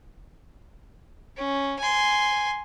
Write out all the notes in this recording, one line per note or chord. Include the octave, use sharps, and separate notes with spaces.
C#4
G#5 C6